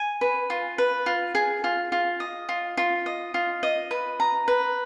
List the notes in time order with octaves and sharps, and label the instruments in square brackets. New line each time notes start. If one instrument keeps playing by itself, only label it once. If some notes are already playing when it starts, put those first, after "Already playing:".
Already playing: [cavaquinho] G#5
B4
F4
B4
F4
G#4
F4
F4
D#5
F4
F4
D#5
F4
D#5
B4
A#5
B4